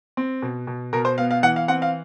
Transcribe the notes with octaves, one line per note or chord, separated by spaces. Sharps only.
C4
B2
B2
B2 A#4
C5
B3 F5
F5
E3 F#5
F5
C4 F#5
F5